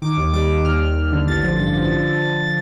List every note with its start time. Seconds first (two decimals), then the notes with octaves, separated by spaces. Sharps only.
0.02 D#3 D6
0.17 D#2
0.33 G3 D6
0.50 G3
0.65 D#2 F6
0.81 D#2
0.96 D#2
1.12 D3
1.27 A1 A6
1.43 F3
1.59 G2
1.75 F3
1.91 D3
2.07 D3
2.22 D3